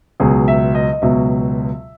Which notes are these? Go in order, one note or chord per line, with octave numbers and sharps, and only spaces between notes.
C#2 B2 F#3 G#4
E5
D#5
D#5
C#2 B2 F#3 E5